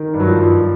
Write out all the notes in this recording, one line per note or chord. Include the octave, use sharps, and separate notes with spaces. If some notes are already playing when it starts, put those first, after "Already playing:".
Already playing: D#3
G2
F#3
F3
G2